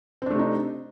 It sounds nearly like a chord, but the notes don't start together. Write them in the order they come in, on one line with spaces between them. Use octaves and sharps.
C4 D4 A3 C3 D#4